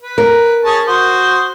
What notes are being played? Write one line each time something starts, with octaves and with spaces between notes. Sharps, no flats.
B4
A#4
C#4 G#4 A5
F#4 C5 D#6